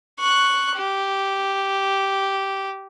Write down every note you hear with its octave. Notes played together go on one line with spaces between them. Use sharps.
C#6 F#6
G4